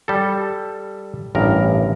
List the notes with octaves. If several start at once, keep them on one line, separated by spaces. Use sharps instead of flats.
G3 A4
A1 G2 A#4